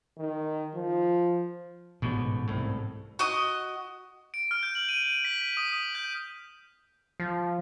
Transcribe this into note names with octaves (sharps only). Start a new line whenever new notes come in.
D#3
F3
A1 G#2 B2
C2 A2
F#4 D#5 D#6
D7
F6
G6
F#7
D#7
D#7
B6
B6
D#6
D#6
G6
F3